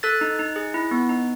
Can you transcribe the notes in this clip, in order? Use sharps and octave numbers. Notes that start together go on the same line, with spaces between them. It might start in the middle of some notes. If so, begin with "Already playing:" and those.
A4 F#6 A6
D#4
D#4
G#4
E4
B3
D#4